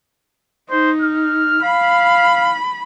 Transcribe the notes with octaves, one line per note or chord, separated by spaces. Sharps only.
D#4 C5
F6
F5 B5